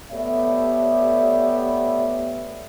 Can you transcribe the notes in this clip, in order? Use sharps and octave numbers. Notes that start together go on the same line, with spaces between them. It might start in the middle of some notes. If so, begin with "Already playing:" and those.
A3 B3 G4 C#5 D5 E5